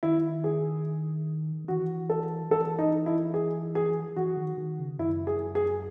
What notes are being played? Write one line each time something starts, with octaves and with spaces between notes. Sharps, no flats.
D#3 E4
G#4
D#3
E3 F#4
A4
E3 A4
D#4
E4
G#4
G#4
E3 F#4
D#3
D#3
C#3
F#2 E4
G#4
G#4